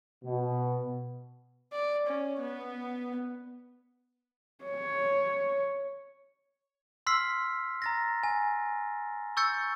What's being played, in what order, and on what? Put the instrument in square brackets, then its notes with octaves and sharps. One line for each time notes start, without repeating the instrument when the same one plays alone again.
[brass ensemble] B2
[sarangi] D5
C#4
B3
[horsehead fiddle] C#5
[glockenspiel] C6 E6 F6 B6 C7
A#5 A6 A#6
G#5
C#6 E6 G6 A6 C#7